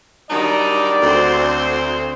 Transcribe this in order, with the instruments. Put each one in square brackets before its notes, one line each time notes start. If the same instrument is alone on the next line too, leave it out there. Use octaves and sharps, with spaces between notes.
[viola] D#3 G3 [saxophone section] F#3 D4 D#4 [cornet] D5
[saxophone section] D2 [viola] C4 C5